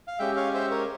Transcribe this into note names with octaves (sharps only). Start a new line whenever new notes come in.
F5
G#3 C#4 G4 E5 G5
C#5 F5
C5 E5
A#4 C#5